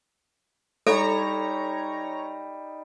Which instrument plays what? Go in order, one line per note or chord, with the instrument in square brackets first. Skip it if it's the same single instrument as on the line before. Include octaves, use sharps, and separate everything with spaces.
[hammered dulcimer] G3 D#4 [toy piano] A4 [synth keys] C#5 A#5